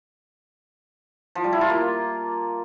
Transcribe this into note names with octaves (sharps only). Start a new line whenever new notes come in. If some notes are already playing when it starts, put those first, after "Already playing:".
F3
G3
E4
F4
A#3